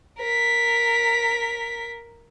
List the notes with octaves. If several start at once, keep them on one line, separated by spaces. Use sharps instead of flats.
A#4 B6